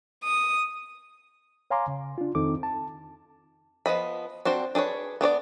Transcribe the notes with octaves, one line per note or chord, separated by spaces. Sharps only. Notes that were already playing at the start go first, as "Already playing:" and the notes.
D#6
C#5 F5 G#5 A#5 C6 D6
C#3
D4 F4
F2 D#3 C4 D#4 A4 D6
A5
F3 B3 D#5 B5
C4 D4 F#4 C5
D4 G#4 B4 C#5
B3 D4 C#5 D5